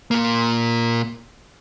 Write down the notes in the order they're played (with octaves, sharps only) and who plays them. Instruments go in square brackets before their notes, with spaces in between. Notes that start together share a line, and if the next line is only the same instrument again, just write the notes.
[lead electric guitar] A#2 A#3